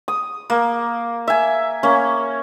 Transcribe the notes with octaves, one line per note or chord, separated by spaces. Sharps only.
D#6
A#3
E5 G#5
A#3 C#4